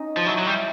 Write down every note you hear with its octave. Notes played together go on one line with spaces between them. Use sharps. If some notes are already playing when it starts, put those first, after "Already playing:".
Already playing: C#4 D#4
F3
F#3 E4
F#3
G3